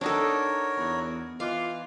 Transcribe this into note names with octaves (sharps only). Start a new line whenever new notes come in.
D4 D#4 F#4 A4 A#4 C#5
E2 B3
E3 F4 D#5 F5 D6 F#6